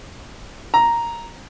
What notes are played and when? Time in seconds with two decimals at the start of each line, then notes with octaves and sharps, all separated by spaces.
0.74 A#5